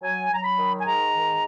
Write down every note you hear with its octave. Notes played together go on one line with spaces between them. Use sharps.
F#3 G#5
F#3 A#5
B5
D#3
G#5
G#2 A#5
D#3